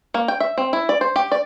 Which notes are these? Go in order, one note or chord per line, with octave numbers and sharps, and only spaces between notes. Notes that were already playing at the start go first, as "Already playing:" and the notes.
A#3
G5
E5
C4
E4
D5
C5
G4
D5